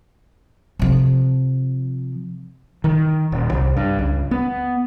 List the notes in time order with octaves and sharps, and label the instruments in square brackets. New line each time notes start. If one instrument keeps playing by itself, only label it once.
[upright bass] C3 F3
[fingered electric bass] D#3
D#1
C2
G2
C#2
B3